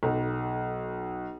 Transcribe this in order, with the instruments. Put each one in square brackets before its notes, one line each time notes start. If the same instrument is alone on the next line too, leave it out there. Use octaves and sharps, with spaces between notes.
[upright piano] B1